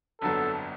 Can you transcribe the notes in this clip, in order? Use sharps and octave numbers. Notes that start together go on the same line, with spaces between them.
G1 F2 D3 F#3 B3 A4